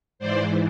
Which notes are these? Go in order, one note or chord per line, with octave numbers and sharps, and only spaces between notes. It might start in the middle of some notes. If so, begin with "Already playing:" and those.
G#2 E3 C5 D5